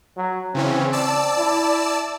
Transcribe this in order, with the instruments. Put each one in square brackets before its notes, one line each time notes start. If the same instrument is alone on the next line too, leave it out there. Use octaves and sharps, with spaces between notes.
[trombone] F#3
[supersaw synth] C#3 E3 C#4 [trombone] C4
[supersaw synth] D5 A5 E6
[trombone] E4